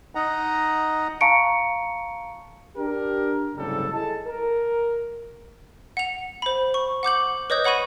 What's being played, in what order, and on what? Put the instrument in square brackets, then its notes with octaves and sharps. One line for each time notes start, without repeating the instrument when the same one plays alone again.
[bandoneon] D#4 D#5 F#5 A#5
[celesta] F5 A5 A#5 C#6 C#7 D7
[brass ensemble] D4 G4 A#4
F#1 C2 G#2 C#3 G3 A4
E4 G#4 A4 D#5 A5
A#4
[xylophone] F#5 F7
C5 B5
C#6
F#5 D6 G6 F#7
B4 C#5 D#5 D#6 G6
C#5 F#5 B5 C#6 D#7